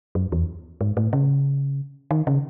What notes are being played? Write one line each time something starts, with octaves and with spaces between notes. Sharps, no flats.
F#2
E2
G#2
A2
C#3
D#3
C#3